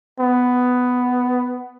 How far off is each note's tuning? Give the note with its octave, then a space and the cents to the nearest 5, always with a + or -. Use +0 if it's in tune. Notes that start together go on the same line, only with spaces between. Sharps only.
B3 +10